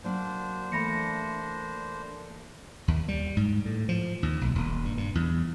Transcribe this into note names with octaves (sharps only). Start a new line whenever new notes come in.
F#3 A#3 D4 F#4 C5
E3 A3 A#3 B5 A#6 C#7
D#2
G3
G#2
A2
F3
D#2
B1
D#1
G2
G2
E2